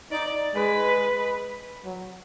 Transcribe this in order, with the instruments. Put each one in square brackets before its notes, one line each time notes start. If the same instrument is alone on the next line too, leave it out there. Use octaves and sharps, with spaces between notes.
[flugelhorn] D#4 [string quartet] D5
[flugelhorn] G#3 [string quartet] B4
[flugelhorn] F#3